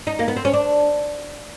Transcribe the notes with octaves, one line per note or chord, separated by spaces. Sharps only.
D#4
A#3
B3
C4
C#4
D4